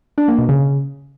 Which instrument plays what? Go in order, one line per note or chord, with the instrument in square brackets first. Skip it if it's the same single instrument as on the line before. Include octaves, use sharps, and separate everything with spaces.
[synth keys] D4
A#3
B2
C#3